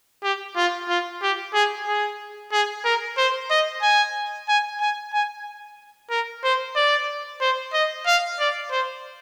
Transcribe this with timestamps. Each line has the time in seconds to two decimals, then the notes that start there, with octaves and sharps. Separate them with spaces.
0.24 G4
0.56 F4
0.89 F4
1.22 G4
1.54 G#4
1.87 G#4
2.52 G#4
2.85 A#4
3.18 C5
3.51 D#5
3.83 G#5
4.48 G#5
4.81 G#5
5.13 G#5
6.11 A#4
6.44 C5
6.76 D5
7.41 C5
7.74 D#5
8.07 F5
8.40 D5
8.72 C5